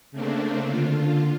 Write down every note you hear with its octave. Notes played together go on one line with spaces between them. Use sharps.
C#3 A3 A#3 C4 D4
D3 F4